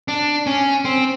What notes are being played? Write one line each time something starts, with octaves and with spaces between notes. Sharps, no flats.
D4
C#4
C4